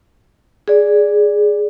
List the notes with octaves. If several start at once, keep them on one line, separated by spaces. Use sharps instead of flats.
G#4 D5